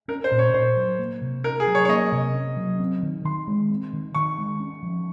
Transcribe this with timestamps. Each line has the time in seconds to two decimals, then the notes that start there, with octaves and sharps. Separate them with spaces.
0.08 C#4 A#4
0.24 C5
0.31 A#2
0.39 C#5
0.54 A#2 C5
0.77 F#3
0.99 A#3
1.21 C3
1.44 C#4 A#4
1.60 G#4
1.67 F#3
1.75 C#5
1.85 C#5
1.89 A#3 D#5
2.12 C3
2.34 C#4
2.57 F#3
2.80 C4
3.03 D#3
3.25 D#3 C6
3.48 G#3
3.70 C4
3.93 D#3
4.15 D#3 C#6
4.38 G#3
4.60 C#4
4.83 F3